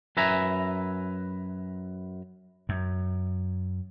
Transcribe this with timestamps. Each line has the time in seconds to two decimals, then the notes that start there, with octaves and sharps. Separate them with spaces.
0.17 F#2 B4 E5 G#5 A#5
2.69 F#2